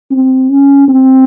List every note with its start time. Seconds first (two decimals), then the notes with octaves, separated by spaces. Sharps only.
0.11 C4
0.50 C#4
0.88 C4